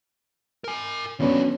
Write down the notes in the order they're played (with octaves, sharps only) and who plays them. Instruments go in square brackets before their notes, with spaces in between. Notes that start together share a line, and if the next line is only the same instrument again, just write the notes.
[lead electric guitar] A#4 G#5
[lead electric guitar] D#2 F#4 [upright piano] F#3 B3 D4 [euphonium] C#4